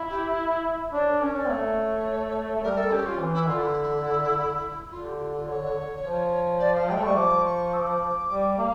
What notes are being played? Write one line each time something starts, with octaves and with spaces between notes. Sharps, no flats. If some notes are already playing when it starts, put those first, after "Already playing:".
Already playing: E4
G4
D4 C#5
A#4
C#4 C#5
D5
A3 C#5
A3
G3 A#4
A4
C#4 G4
F4
E3
E4
D3 F4
E4
D3 F4
G4
F4
F4
C#5
F3
D5
F5
A3 G5
G3 C#6
F3 D6
C#6
E6
D6
G3
A#3